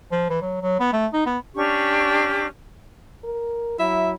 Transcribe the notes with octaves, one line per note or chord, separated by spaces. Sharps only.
F3
E3
F#3
F#3
B3
A3
D#4
B3
C#4 D4 G4 C#6
A#4
F#3 E4 E5